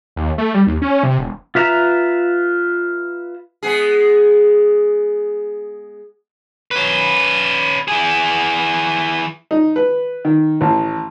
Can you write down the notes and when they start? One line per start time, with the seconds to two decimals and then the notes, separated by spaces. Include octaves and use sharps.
0.16 D#2
0.38 A3
0.54 G3
0.67 D#2
0.82 C#4
1.03 C3
1.18 E1
1.55 F4 B4 E5 A#5
3.63 G#3 B3 G#4
6.71 C#4 B4
7.88 E3 G#4
9.51 D#4
9.76 B4
10.25 D#3
10.61 A1